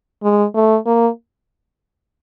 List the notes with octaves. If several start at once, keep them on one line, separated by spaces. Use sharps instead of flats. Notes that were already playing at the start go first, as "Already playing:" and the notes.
G#3
A3
A#3